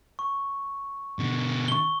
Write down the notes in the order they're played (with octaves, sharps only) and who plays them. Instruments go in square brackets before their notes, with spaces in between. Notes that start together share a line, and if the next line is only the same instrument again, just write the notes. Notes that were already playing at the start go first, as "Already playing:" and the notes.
[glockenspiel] C#6
[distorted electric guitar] B2 D3
[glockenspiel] C#6 G7